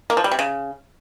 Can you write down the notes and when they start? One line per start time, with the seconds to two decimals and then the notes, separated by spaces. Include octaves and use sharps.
0.10 A#3
0.17 F3
0.24 G3
0.31 C3
0.39 C#3